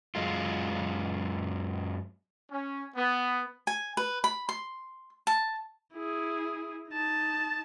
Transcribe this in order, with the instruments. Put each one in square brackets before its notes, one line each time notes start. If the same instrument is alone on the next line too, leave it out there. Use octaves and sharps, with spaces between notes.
[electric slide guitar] F#2 G#3 F4
[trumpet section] C#4
B3
[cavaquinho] G#5
B4
B5
C6
A5
[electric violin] E4 G#4
D#4 A5